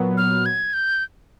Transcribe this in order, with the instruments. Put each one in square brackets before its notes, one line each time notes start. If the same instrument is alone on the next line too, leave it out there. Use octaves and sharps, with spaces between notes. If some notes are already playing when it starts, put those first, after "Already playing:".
Already playing: [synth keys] A#2 F#3 B3
[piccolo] F6
G#6
G6